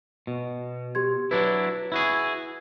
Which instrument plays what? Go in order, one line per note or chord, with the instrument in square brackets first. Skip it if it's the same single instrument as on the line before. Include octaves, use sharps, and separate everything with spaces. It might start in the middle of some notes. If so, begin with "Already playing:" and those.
[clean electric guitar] B2
[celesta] G4 C6 G#6
[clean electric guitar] F#3 D4 E4 [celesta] B4
[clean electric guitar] E4 F#4 G#4